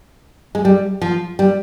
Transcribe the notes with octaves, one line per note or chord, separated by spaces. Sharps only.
G#3
G3
F3
G3